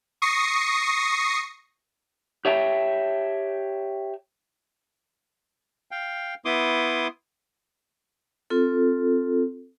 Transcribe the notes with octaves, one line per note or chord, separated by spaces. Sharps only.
C#6 D#6 A#6 C7 C#7
G4 C#5 E5 G5 A5
F5 G5
B3 E4 C6 D6 D#6
C4 F4 A4